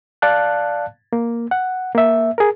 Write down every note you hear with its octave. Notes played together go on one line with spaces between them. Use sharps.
D5 F5 A5 F#6
A#3
F#5
A#3 E5
G#4 A#4